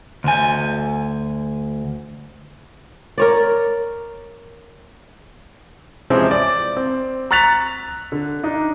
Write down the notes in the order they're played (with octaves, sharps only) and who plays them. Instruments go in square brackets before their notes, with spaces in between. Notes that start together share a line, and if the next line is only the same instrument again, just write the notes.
[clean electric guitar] D2 G#5
[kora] A#4 C#5 D5
[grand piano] C3 E3 F3 G#3 C4 C#4
D5
C4
A#5 C#6 F#6 A6 B6 F7
D3
D4 D#4